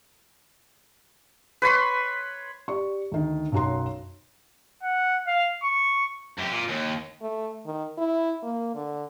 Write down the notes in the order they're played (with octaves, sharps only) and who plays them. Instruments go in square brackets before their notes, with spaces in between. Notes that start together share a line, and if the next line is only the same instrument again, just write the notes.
[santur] B4 C#5 B5 C6
[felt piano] G4 D5 C#6
D2 D#3
B1 F#2 F#4 A#5 C6
[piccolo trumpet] F#5
F5
C#6
[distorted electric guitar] F#2 G4
A#2
D#2
[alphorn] A3
D#3
E4
A#3
D3